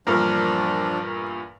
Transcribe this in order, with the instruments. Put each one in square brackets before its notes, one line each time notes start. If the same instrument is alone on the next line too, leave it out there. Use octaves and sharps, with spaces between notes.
[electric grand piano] E2 G2 A#2 [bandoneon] F3 D4 [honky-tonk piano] A#4